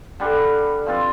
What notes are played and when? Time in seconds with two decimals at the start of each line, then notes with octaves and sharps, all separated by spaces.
0.20 D3 G3 D4
0.86 F3 C4 F4